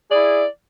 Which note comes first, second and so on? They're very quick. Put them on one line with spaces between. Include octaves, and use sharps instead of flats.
D5 G#4 E4